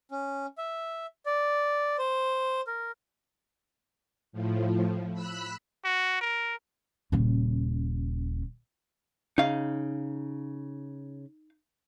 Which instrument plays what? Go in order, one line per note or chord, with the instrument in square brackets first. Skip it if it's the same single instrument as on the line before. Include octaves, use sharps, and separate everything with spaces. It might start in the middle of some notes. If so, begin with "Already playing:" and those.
[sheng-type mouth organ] C#4
E5
D5
C5
A#4
[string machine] A2 F3
B5 E6 F#6 B6
[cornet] F#4
A#4
[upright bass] D#1 C#3
[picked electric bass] C#3 [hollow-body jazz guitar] D#4 F5